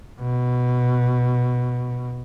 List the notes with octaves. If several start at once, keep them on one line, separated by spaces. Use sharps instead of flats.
B2